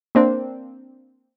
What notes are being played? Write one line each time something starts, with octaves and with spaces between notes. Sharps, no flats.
A#3 C4 D4